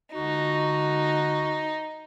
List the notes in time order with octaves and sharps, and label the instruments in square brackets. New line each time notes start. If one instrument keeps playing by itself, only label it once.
[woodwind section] C#2 D3 F#4 [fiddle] D#4